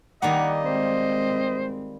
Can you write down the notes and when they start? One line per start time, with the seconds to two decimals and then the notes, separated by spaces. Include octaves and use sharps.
0.22 D#3 G3 A#3 D#5 F#5
0.65 G#3 C4 C5